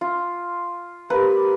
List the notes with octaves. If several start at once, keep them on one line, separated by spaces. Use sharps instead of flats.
F4
A#3 G4 B4